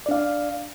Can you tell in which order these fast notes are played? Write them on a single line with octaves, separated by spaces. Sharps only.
D5 D4 F5